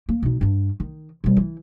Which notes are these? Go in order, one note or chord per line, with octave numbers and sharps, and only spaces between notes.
A#3
B2 D#4
G2 D4
D#3
B2 G3
E3